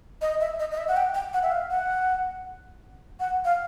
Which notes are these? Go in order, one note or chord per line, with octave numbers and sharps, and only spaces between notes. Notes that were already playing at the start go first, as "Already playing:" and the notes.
D#5
E5
D#5
D#5
E5
F#5
G5
G5
F#5
E5
F5
F#5
F#5
F5